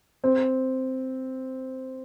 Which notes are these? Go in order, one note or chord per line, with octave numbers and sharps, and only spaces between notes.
C4